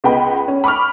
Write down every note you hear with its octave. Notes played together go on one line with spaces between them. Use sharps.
C#2 B3 D#5 G5 B5
C#4
B5 C#6 D6 F6